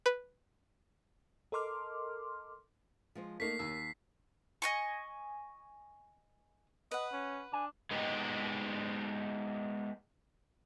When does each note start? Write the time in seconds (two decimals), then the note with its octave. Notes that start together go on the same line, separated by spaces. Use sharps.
0.06 B4
1.52 A4 A#4 D#5 C6 D6 F6
3.15 F3 G#3 C5
3.40 A3 A#3 D#4 A#4 C#5 B6 C7
3.59 D#2 E6
4.62 D#5 G#5 C#6
6.91 B4 D#5 F#5
7.13 C#4
7.53 D4 G#5
7.91 G#3 B3 D#4 G4